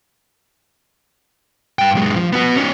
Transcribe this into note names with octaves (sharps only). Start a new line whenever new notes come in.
G2 G5
F#2 G#3
F3
B3 F#4
C#4 D#4